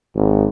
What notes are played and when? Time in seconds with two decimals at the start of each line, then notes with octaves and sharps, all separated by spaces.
0.15 G#1